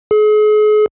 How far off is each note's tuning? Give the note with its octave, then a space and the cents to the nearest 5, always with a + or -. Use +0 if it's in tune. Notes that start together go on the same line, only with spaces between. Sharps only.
G#4 +40